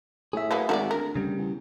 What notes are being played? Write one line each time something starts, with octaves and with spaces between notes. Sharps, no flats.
A2 G#4 E5
F#3 A#3 B3
G#1 F#4 A#4 D5
D2 A#4
C#3 G3
E2